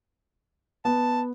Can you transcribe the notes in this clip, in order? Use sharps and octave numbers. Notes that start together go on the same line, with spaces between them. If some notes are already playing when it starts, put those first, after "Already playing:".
B3 A5